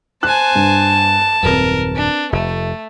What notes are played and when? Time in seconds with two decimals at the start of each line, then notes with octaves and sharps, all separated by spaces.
0.23 C5 G#5 A5 F#6
0.55 G2
1.43 D#1 F#2 C4 A#4 B4
1.96 D4
2.32 F1 A3